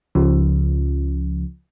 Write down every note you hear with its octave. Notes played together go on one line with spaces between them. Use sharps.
C#2 C#3 F3